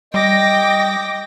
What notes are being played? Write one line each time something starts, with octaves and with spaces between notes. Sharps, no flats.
G3 D#5 G5 D6 A#6